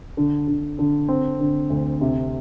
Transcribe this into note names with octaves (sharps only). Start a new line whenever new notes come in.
D3
D3
D3
C4
D3
D2
C3